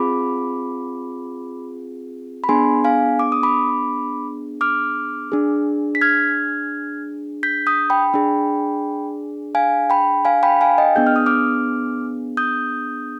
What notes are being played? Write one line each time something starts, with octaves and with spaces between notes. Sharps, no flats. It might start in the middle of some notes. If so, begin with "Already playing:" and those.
Already playing: C4 F4 G#4 B5 D6
B5
B3 D4 G#4 G#5 C6
F5 G#5
D6
D#6
B5 D6
D6 F6
D4 G#4
B6
F6 G#6
G6 B6
D#6 G6
G5 B5
D4 G#4
F5 G#5
G5 B5
F5 G#5
G5 B5
F5 G#5
D#5 G5
B3 D4 G#4 G6
F6
D#6
D6 F6
D#6 G6